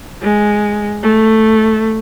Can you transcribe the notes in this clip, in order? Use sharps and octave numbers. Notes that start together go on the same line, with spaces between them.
G#3
A3